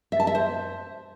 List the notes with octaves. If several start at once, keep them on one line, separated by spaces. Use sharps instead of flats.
E5
A5
E5
C5